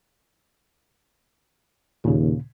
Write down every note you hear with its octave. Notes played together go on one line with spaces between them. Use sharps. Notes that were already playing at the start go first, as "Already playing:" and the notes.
D#2 A#2 C#3